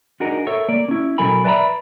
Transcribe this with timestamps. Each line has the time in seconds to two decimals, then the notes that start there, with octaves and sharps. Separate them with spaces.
0.20 D4 D#4 F#4 G#4 A#4
0.47 A4 A#4 C#5 E5
0.69 A#3 D5
0.88 C#4 E4
1.18 B1 F#3 A4 A#4 G#5 B5
1.44 B4 D5 E5 G5 A#5 B5